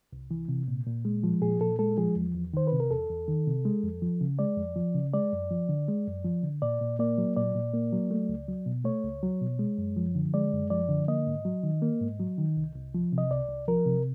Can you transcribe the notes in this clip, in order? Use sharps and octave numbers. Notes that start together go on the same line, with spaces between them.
C2
E3
C3
A#2
A#2
G#3
F3
A#2 G#4
A#2 A4
G#3 A4
F3 G#4
E2
E2
D#3 C5
C3 B4
A#4
E2 A4
E2
D#3
C3
G#3
F2
F3
C#3
G#3 D5
F2
F3
C#3
G#3 D5
F#2
F3
D3
G#3
F#2
F3
D3
A#2 D5
A#2
A#3 D5
F#3
A#2 D5
A#2
A#3
F#3
A3
C#2
F#3
B2
A3 C#5
C#2
F#3
B2
G#3
F#2
F3
D3
G#3 D5
F#2
F3 D5
D3
A#3 D#5
G#2
F#3
D#3
A#3
G#2
F#3
D#3
C2
C2
F3
C3
D#5
C2 D5
C2
F3 A#4
C3